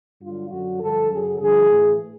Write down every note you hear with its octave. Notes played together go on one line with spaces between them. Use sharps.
G2 D3 F#3 F4
F#2 D3 F#3 F#4
G2 D3 F3 A4
F#2 C#3 F#3 G#4
G2 D3 F3 G#4
A2 E3